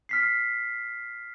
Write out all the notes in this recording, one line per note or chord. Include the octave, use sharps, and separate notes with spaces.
F6 B6 C7